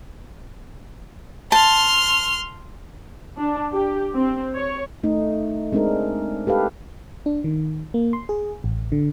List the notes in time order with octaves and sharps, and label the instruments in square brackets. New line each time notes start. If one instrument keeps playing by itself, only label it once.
[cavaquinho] A5 [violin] C6 F6
[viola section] D4
G4
C4
C#5
[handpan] A3 D#4
G#3 C4 D4 D#4 A#4
G4 A4 B4 F5
[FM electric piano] D4
D#3
A#3
C6
G#4
A1
D3